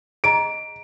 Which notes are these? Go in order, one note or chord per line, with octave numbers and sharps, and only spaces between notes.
G#4 D#5 A#5 D7